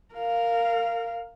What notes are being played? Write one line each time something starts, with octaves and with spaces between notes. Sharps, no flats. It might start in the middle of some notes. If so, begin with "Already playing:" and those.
A#4 F5